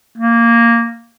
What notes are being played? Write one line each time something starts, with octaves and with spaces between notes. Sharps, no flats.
A#3